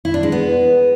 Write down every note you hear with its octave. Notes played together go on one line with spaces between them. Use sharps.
E4
D4
G#3
B3